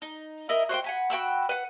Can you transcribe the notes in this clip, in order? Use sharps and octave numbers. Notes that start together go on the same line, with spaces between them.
D#4
E4 A#4 D#5
F#4 C5 D#5 G5
F#5 G#5 B5
F#4 G5 B5 E6
B4 F#5